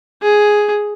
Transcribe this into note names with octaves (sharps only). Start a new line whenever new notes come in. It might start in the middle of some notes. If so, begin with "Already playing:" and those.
G#4